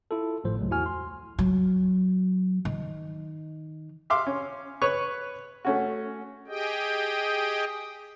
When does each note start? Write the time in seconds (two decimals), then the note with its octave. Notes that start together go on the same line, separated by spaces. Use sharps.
0.11 E4 F4 A4
0.44 G#1 A2 F3 C5
0.57 C#2 F#3 A3
0.71 E2 E4 F#4 G#5 F6
0.86 C6
1.39 F#3
2.65 D#3
4.10 E5 F5 C6 D6
4.27 C#4
4.82 B4 C#5 C#6
5.65 A3 C#4 F#4
6.47 G4 G#4 D#5 G5